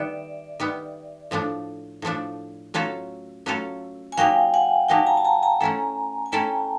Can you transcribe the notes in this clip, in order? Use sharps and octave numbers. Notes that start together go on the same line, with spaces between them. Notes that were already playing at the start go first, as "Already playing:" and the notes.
Already playing: D#3 G3 B3 D5 E5
D#3 G3 B3
A2 F3 A3 D4
A2 F3 A3 D4
F#3 A3 C#4 F4 A4
F#3 A3 C#4 F4 A4
G#5
F#3 A#3 D#4 G4 F5 G5
F#5 G#5
F#3 A#3 D#4 G4 G5 A5
G#5 A#5
A5
G#5 A#5
G#5 A#5
A3 C#4 E4 A4
G#5
A3 C#4 E4 A4 G5 A5